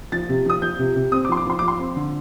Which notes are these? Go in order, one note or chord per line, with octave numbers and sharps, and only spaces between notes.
F3 A6
C3
F3 D#6
F3 G6
C3
C3
C4 D#6
D6
F3 C6
D6
F3 C6
F3 D6
C6
C4
D3